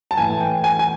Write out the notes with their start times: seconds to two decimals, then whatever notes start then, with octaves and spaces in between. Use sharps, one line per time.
0.11 A5
0.17 A2 E3 G#5
0.40 G5
0.64 G#5
0.79 G#5